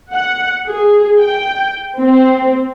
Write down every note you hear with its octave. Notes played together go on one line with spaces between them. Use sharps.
F#5
G#4
G5
C4